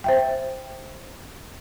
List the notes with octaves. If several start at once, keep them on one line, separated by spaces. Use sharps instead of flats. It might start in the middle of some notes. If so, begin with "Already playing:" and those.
C5 E5 G5